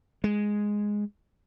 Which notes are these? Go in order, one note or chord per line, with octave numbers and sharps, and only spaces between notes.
G#3